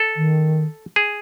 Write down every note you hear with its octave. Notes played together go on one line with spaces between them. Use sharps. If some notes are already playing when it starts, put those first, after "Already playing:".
Already playing: A4
D#3
G#4